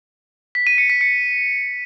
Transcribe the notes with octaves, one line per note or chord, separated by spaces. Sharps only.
B6
D#7
C#7
B6
C#7